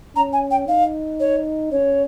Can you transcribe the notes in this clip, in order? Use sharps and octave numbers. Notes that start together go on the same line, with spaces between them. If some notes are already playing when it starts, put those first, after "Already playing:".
C#4 A#5
G#5
G5
D#4 F5
C#5
C#4 C#5